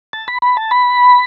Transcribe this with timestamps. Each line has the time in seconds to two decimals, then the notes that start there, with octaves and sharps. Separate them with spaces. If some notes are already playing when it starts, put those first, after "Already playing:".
0.13 A5
0.28 B5
0.42 B5
0.57 A5
0.71 B5